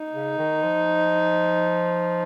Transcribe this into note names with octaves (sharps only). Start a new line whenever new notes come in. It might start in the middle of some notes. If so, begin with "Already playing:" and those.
Already playing: D#4
C#3
D#3
F3